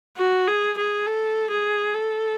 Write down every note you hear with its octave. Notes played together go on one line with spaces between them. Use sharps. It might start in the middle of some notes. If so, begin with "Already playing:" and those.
F#4
G#4
G#4
A4
G#4
A4